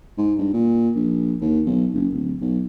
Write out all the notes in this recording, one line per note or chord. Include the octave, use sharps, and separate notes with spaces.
G#2
G2
A#2
A#1
D#2
B1
F#1
D1
B1